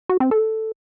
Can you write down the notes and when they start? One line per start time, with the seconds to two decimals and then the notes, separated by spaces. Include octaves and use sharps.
0.09 F#4
0.20 C4
0.31 A4